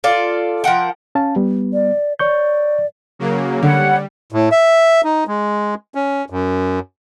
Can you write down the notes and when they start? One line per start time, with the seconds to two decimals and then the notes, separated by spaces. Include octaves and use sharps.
0.04 F4 A4 D5
0.64 F3 A#4 F#5 G5
1.15 C#4 F5 A5
1.36 G3 B3
1.73 D5
2.19 C#5 D5 C#6 G6
3.19 C#3 F#3 A#3
3.63 D3 G3 C#5 F#5
4.32 A2
4.52 E5
5.04 D#4
5.27 G#3
5.95 C#4
6.30 F#2